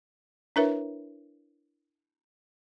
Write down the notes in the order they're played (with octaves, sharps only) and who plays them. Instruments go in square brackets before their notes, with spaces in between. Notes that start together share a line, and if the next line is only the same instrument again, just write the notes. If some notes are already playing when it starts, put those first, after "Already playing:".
[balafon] D4 E4 A#4 B4 C#5 E5